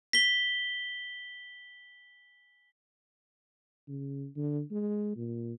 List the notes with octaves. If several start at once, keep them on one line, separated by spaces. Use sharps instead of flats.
B6 G7
C#3
D3
G#3
A#2